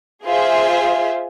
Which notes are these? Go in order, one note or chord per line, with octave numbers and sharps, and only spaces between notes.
F4 G#4 C5 E5